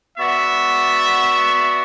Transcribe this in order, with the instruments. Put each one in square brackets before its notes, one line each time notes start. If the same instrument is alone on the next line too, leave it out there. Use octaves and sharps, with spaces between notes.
[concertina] B3 F#4 D5 F#5 [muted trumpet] E5